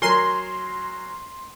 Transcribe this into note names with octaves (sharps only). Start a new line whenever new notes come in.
F#3 A#4 G#5 C6